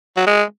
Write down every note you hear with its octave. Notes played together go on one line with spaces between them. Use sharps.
F#3
G#3